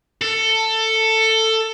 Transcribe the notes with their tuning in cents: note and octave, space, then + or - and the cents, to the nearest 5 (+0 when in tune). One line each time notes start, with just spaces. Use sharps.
A4 +15